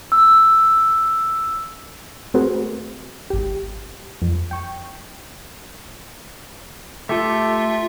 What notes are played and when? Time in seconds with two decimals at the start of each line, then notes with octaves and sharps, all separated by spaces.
0.12 E6
2.34 A3 C4 F#4 G#4 A#4 B4
3.30 G#1 G4
4.22 F2
4.51 G5 C#6
7.09 A3 F4 G4 A4 E5